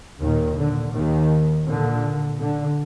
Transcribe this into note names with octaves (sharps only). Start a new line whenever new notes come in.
D#2 A#2 D#3
D3
D#2 D#3
A#2 D3
D3